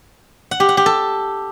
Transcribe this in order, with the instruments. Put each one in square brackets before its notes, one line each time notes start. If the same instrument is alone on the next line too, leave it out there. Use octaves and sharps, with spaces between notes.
[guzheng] F#5
G4
F#5
G4
A4